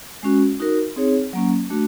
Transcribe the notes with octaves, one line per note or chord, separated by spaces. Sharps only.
G#3 C#4 F#4
D#4 F#4 A#4
C4 D#4 G#4 C#5
F#3 A#3 C#4
A3 D4 F#4